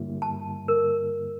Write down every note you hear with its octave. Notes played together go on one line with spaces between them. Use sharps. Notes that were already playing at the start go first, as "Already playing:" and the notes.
Already playing: G2 D3 G3 A#3 E4
A5
A#4